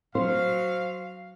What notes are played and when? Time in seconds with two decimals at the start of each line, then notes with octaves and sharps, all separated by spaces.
0.15 F#3 C5 F5